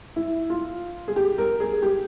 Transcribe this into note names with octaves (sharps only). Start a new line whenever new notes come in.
E4
F4
G#4
G4
A#4
G#4
G4